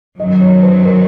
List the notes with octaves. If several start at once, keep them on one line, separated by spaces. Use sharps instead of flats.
F#2 D#3 F#3 D#5
C#5
C5
A#4